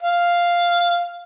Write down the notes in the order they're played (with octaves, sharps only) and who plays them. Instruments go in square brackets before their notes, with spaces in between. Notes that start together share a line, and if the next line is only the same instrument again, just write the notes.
[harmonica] F5